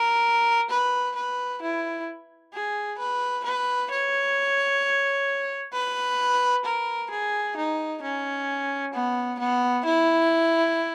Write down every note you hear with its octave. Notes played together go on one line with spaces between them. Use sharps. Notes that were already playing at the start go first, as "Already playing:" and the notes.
Already playing: A#4
B4
B4
E4
G#4
B4
B4
C#5
B4
A#4
G#4
D#4
C#4
B3
B3
E4